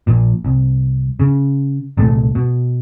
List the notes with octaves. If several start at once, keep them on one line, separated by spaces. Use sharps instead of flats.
A#1 A#2
C2
C#3
C2 A#2 A3
B2